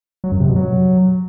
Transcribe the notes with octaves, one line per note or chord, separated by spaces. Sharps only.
F#3
F#2
C3
B2
F#3